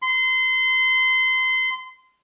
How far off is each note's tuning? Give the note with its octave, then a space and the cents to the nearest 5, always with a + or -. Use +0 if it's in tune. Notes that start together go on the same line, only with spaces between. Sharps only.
C6 -25